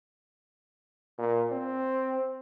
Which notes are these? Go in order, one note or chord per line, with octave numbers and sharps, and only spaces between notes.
A#2
C4